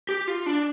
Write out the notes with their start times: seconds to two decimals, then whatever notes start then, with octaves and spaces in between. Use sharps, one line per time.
0.09 G4
0.27 F4
0.46 D4